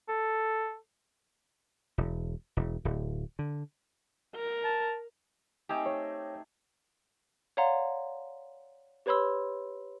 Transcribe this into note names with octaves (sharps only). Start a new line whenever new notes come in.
A4
E1
E1
D1
D3
A#4
A5
A3 C4 D#4 G4 G#4
C#5
C#5 D5 F5 F#5 A#5 C6
G4 B4 C#5 B5 C6 E6